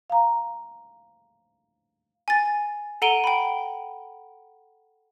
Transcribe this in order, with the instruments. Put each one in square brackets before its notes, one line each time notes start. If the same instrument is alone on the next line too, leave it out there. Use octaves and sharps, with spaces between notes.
[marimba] F5 A#5
[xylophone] G#5 A6
A4 F#5 A#5 D7 D#7 G7
G5 B5